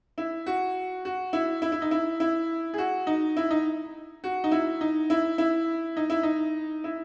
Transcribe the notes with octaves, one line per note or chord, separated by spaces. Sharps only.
E4
F#4
F#4
E4
E4
E4
D#4
E4
E4
G#4
F#4
D#4
E4
D#4
F#4
D#4
E4
D#4
E4
E4
D#4
E4
D#4
E4